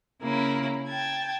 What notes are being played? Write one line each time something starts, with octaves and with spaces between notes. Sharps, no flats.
C#3 A#3 E4 A#4
G5 A5 G#6